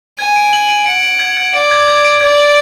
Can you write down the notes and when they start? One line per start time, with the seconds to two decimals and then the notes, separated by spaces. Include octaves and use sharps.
0.19 G#5 G#6
0.36 D7
0.53 F#7
0.69 D7
0.86 F#5 D7
1.03 D7
1.19 G#6
1.37 G#6
1.54 D5 D7
1.71 G#6
1.88 G#6
2.05 D7
2.21 D5 G#6
2.38 F#7